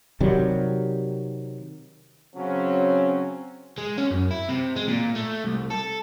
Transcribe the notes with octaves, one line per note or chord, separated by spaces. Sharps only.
C3 D#3 F#3 G3
C#3 F#3 C4 C#4
G#3
C#4
F#2
E4
C3
G#3
A#2
A3
C2
A4